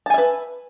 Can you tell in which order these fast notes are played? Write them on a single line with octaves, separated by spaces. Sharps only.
A5 G#5 E5 B4